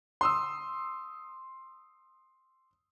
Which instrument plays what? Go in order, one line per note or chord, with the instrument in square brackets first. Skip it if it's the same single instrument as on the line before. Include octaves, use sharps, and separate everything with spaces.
[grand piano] C6 D#6 E6